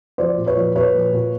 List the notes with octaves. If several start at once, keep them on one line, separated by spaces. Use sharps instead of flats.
F3 C5 D5
A#2
B4 C#5
F3
A#2 B4 C#5
F3
A#2